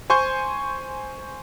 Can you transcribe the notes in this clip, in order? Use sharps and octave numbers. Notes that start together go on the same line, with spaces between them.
C5 G#5 C6 C#6 G6